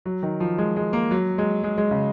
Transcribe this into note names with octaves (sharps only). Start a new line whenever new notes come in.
F#3
D#3
F3
G#3
G#3
A#3
F#3
G#3
G#3
G#3
C#3